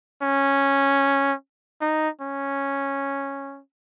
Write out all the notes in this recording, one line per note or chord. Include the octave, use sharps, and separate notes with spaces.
C#4
D#4
C#4